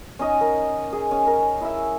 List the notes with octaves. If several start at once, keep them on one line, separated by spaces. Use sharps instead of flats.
C#4 D#4 D#5
A#4
G#4
C#4
A#4
E4 E5